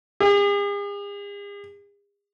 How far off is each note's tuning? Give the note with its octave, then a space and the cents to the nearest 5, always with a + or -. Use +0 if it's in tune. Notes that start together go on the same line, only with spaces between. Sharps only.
G#4 -45